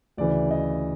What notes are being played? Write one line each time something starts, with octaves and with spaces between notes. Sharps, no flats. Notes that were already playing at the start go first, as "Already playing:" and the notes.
D2 C#3 E3 D5
D#5